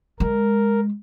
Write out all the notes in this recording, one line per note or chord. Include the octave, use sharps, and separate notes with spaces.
G#3 A#4